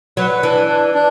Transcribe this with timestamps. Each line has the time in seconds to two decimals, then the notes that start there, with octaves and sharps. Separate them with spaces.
0.17 F#3 B4
0.43 E3 D4
0.68 D4
0.94 D4